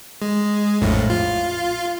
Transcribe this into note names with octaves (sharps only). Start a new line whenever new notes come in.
G#3
A#1 F2 A2
F4